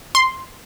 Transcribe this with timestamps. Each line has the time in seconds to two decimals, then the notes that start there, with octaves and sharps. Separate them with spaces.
0.15 C6